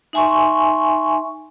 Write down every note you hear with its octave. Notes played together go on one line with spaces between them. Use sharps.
D#4 E5 G#5 C6 C#6